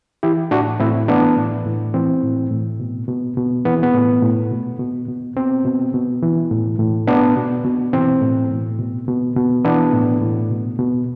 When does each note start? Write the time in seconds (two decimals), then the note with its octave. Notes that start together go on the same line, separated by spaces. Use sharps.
0.23 E3 E4 G4
0.51 A2 D4 F#4
0.80 A2 C4 E4
1.08 E3 B3 D4
1.37 A2
1.66 A2
1.94 E3 C4
2.23 A2
2.51 A2
2.80 B2
3.08 B2
3.37 B2
3.65 E3 B3
3.83 B3
3.94 A2
4.22 A2
4.51 B2
4.79 B2
5.08 B2
5.36 B2 C4
5.65 B2
5.94 B2
6.22 E3
6.51 A2
6.79 A2
7.07 B2 B3 D4
7.36 B2
7.65 B2
7.93 E3 C4
8.22 A2
8.50 A2
8.79 B2
9.08 B2
9.36 B2
9.64 E3 B3 D4
9.93 A2
10.21 A2
10.50 B2
10.79 B2